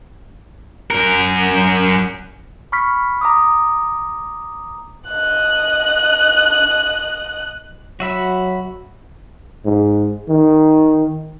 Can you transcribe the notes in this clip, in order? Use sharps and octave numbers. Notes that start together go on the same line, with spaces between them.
F#2 A#4
B5 C#6 F6 B6
A#5 D6 D#6
D#5 F#6
F#3 F#4 E5 B5
G#2
D#3